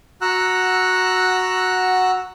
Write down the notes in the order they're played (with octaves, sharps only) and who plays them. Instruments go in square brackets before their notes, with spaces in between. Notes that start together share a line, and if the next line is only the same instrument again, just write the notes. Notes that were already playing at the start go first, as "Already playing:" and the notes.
[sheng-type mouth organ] F#4 F#5 A#5 E6 F#6